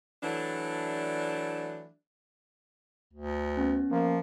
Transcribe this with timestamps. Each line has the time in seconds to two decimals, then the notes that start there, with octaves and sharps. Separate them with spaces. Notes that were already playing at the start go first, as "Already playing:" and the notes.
0.23 E3 F#3 A3 D4
3.13 D2
3.57 B3 C#4
3.91 F3 A#3